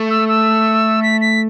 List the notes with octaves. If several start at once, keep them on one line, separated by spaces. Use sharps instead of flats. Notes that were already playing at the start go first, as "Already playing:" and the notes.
Already playing: A3
E6
E6
B6
B6